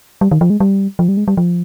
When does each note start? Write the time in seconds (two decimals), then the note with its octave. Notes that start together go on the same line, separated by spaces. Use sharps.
0.21 G3
0.31 D#3
0.41 F3
0.50 G#3
0.60 G3
0.99 F3
1.09 G3
1.17 G#3
1.28 G3
1.37 F3